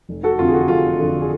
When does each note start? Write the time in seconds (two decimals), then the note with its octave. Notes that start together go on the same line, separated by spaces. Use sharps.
0.09 F1
0.23 F#4 A4
0.39 F2 D3 F4
0.48 G#4
0.53 F#4
0.68 F1 F4 G#4
0.99 F2 D3
1.21 G#4